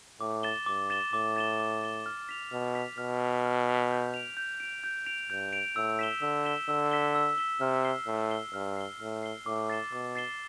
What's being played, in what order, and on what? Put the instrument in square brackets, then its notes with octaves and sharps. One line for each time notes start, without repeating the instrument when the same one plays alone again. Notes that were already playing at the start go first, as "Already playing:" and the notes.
[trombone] A2 [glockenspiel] D6
[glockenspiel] A6 E7 G7
[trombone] G2 [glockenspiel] D6
[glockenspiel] A6 E7 G7
[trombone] A2 [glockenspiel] D6
[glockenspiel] A6 E7 G7
D6
A6 E7 G7
F6
B6 F7
[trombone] B2 [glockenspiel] F6
[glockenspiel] B6 F7
[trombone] B2 [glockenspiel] F6
[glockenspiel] B6 F7
F6
B6 F7
G6
D7 F7
G6
D7 F7
G6
D7 F7
[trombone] G2 [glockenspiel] G6
[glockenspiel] D7 F7
[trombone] A2 [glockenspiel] E6
[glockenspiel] B6 E7 G7
[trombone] D3 [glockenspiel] E6
[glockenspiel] B6 E7 G7
[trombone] D3 [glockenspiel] E6
[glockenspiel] B6 E7 G7
E6
B6 E7 G7
[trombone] C3 [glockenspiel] F6
[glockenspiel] C7 G7
[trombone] A2 [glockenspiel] F6
[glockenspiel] C7 G7
[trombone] G2 [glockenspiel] F6
[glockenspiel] C7 G7
[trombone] A2 [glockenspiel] F6
[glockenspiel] C7 G7
[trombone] A2 [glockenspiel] D6
[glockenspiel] A6 C7 E7 G7
[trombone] B2 [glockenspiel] D6
[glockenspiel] A6 C7 E7 G7